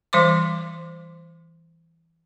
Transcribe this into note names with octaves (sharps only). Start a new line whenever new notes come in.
E3 G3 C5 C6 D6